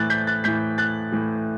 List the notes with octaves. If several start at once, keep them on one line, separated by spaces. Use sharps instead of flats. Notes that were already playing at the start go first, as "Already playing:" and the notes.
Already playing: A2 E3 F#6 A6
G6 B6
F#6 A6
A2 E3 G6 B6
F#6 A6
A2 E3